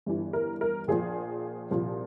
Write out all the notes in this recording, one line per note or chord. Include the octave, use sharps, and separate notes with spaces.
G1 G2 E3
A#4
A#4
A#1 A#2 F3 G#4
C2 A#2 F3